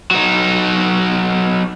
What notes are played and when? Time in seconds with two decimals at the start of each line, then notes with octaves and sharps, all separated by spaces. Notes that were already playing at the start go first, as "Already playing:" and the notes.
0.11 F#3 D#4